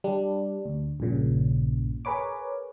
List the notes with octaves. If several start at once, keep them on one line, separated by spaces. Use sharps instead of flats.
G3 D4
D2
A#1 G2 A#2 C#3
G#4 A#4 B4 C#5 D6